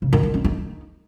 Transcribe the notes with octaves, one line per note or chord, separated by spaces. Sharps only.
C#3
D#3
E4
C#4
D#4